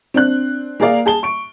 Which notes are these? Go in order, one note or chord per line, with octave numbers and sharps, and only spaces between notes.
C4 D4 F#6
A#3 G#4 A#4 D5 F5
G#4 A5 G7
C#6 D7